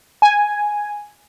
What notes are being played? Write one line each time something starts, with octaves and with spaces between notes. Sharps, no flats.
G#5